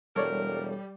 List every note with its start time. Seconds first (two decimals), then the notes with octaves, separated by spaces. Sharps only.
0.16 E1 G3 A4 A#4 C#5 D5